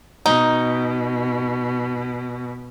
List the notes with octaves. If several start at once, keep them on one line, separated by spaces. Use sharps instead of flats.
B2 D#4